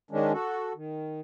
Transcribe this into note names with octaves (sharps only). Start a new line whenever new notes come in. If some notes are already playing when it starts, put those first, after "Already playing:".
D#3 G#3 C#4 D4
F#4 A4
D#3